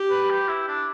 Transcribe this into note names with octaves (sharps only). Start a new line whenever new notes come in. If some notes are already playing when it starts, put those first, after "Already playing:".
Already playing: G4
B4
G4
E4
D4